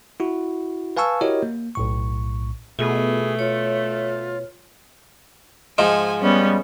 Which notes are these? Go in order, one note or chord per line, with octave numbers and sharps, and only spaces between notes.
E4 F#4
B4 F5 G#5 A5 C#6 E6
E4 F#4 G4 A#4 C#5 D#5
A#3
B1 A2 C#6
B2 A3 B3 F4 G#4
F4 C#5
G#2 F3 D#4 G#5
G3 B3 C#4